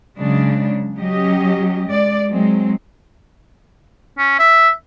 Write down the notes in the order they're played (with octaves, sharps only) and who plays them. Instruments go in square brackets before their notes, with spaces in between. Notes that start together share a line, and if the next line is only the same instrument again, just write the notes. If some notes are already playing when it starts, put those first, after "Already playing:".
[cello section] C#3 F#3 G#3 D4
F#3 C#4 G4 D#5
G#3 D5
F#3 G#3 C4
[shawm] C#4
E5